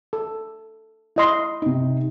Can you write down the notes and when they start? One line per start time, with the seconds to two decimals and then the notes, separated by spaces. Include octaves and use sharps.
0.13 A4
1.16 E4 D#5 C6
1.62 C3 D#4